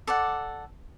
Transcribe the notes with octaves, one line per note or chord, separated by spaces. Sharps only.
A4 D5 F#5